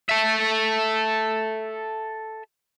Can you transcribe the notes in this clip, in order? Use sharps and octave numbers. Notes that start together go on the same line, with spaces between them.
A4 E5